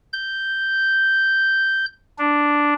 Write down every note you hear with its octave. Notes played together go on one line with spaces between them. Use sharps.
G6
D4